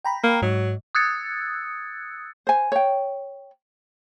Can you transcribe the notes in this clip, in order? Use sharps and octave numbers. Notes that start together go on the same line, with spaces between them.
G5 A#5 B5
A#3
G#2 F#3
D#6 E6 F#6 G#6 A6 C#7
C5 G#5
C#5 G5